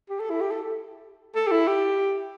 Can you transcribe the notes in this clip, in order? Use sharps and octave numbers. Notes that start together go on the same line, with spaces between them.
G4
A4
E4
G4
A4
A4
G4
E4
G4